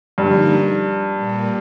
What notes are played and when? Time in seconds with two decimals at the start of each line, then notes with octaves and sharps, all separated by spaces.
0.18 G2 D3 F3 A#3 D#4 A#4
1.13 A#2 G3 A#3